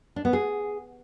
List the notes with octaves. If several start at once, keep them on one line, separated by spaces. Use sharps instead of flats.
D4
B3
G#4